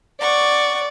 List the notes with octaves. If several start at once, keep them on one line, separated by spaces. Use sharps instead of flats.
D5 F#5 C#6